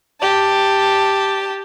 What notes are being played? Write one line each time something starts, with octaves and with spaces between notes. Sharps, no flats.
G4 A5